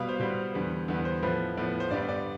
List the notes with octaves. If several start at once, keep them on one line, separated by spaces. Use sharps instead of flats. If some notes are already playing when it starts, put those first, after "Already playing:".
Already playing: B2 G3 B3 F5
C5
B2 G3 B3 C5
E2 D3 G3 B3
E2 D3 G3 B3
C5
A2 F3 B3 B4
A2 F3 B3
C5
G2 D3 G3 B3 D5
D5